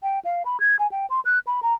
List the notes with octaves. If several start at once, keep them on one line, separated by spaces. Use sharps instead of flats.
G5
F5
B5
G#6
G#5
G5
C6
F#6
B5
A#5